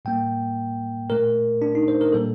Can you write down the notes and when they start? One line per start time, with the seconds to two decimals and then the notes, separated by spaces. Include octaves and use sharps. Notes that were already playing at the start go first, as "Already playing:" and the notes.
0.05 A2 G3 A#3 G5
1.10 A#2 A3 A#4
1.62 D4
1.75 D#4
1.88 C5
2.01 A#4
2.12 A#2 G3 A#3 A4